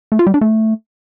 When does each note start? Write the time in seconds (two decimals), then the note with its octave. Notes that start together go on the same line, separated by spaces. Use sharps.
0.12 A3
0.19 F4
0.27 G3
0.34 D4
0.41 A3